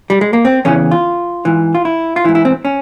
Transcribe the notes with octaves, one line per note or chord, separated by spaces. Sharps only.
G3
G#3
A#3
C4
E2 C#3 E3 C#4
F4
G#2 E3
F4
E4
F4
G#2 E3 E4
E4
C4
C#4